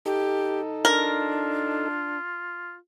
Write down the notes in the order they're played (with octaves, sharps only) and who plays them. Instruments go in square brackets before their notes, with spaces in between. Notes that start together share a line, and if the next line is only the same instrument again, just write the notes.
[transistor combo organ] D#4 A4 [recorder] G4
[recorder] D4 [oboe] F4 [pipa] A#4